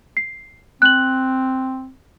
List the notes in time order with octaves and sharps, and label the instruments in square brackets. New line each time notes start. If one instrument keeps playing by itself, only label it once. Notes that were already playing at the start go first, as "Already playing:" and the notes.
[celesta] C7
[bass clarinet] C4 [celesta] F#6 F#7